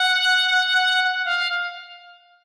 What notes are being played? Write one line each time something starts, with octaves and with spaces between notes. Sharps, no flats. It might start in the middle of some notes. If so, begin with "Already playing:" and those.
Already playing: F#5
F#5
F5